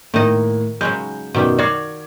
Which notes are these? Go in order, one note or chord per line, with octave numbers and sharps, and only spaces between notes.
A2 D#3 A#3 D#4
C#3 F#3 G#3 G6
F#2 B2 D#3 G3
F#4 D5 F5 D6 G#6